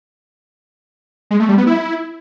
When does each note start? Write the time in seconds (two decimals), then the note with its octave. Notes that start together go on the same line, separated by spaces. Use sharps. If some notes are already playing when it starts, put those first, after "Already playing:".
1.31 G#3
1.40 A3
1.49 G3
1.58 B3
1.67 E4